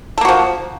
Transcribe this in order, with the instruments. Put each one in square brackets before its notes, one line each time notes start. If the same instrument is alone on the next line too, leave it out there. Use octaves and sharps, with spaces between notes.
[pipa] A4
A#3
F#4
F3